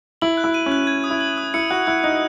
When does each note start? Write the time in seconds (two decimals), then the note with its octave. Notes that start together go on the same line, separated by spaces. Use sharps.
0.22 E4 F#7
0.37 F#6
0.44 E4
0.54 D#7
0.66 C#4
0.72 F#6
0.87 G#6
1.04 D#6
1.10 E4
1.21 F#7
1.38 D#6
1.54 E4 C#7
1.70 F#4 F#6
1.87 E4 F#6
2.04 D#4 F#6